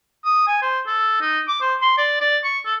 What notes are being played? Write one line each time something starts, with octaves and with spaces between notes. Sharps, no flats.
D#6
G#5
C5
A4
D#4
D6
C5
C6
D5
D5
C#6
A4